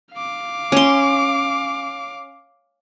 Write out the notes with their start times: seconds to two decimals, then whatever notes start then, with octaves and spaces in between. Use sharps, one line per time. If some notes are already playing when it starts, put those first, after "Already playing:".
0.14 F5 D6
0.72 C#4 C6